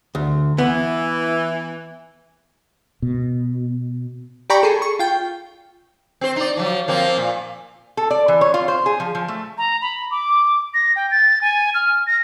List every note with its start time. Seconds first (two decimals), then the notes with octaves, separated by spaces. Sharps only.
0.15 D2
0.58 E3 B3
3.02 B2
4.50 G4 D5 G5 A#5 B5 C#6
4.63 G#4 A4
4.82 C#6
4.99 F4 G5
6.21 C4 C5
6.36 D#4 D5
6.57 F3 F#3
6.88 F3 A#3 C4
7.17 A#2
7.97 A4
8.11 D5
8.28 E3
8.41 C#5
8.54 F4
8.68 C5
8.86 G#4
9.00 F3
9.15 F3
9.28 A3
9.58 A#5
9.82 B5
10.11 D6
10.74 A#6
10.96 G5
11.11 A6
11.42 G#5
11.74 F6
12.07 A#6